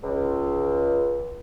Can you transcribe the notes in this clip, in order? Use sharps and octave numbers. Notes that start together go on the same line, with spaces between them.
C#2